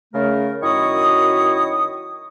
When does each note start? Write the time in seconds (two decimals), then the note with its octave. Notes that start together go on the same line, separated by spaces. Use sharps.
0.14 C#3 A3 A#4
0.62 F#2 D#3 E4 F#4 C#6 D#6